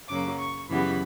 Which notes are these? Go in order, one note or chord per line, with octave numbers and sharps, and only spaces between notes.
F#2 C#3 F#3 A#3 D6
C#6
F#2 C#3 E3 G3 B3 B5